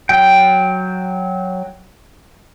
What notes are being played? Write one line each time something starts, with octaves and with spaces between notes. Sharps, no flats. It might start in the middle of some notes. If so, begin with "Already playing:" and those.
F#3 G5